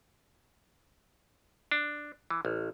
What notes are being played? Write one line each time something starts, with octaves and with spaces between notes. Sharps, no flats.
D4
E3
A1